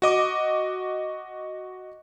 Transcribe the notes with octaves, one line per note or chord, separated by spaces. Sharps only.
F#4 D#5 D6